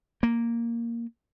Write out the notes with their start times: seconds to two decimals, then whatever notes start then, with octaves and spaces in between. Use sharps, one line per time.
0.23 A#3